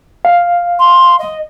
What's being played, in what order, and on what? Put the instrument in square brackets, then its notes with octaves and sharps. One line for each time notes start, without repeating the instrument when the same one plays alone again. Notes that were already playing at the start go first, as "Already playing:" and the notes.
[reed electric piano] F5
[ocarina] C6
D#5